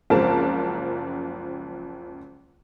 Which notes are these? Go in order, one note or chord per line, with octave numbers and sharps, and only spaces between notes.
F#1 C#2 F3 C4 A#4 A5